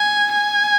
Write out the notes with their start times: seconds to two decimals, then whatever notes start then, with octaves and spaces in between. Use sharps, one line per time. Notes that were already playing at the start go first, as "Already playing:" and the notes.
Already playing: G#5
0.31 G#5